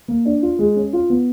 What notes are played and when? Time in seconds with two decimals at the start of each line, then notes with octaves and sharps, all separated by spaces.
0.08 A#3
0.25 D4
0.42 F4
0.59 G#3
0.76 C#4
0.93 F4
1.10 B3